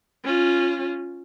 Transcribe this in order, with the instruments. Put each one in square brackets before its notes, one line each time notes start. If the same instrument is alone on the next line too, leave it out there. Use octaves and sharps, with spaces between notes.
[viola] C#4 F4